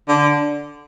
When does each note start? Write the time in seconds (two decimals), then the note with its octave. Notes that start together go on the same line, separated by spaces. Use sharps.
0.08 D3